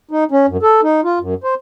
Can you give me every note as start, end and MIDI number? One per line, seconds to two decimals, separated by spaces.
0.11 0.24 63
0.31 0.46 61
0.48 0.57 42
0.63 0.81 69
0.83 1.01 63
1.04 1.19 65
1.20 1.34 42
1.44 1.55 72